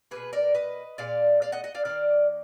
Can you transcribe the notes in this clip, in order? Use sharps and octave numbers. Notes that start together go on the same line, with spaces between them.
B2 F#3 A#3 G#4 B4
A#4 D5
B4 D#5
A#2 G#3 D5 F5
D5 F5
D#5 F#5
D#5 F#5
D5 F5
D#3 A#3 D5 F5